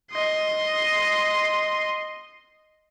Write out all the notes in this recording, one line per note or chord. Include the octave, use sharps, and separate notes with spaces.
D#5 C6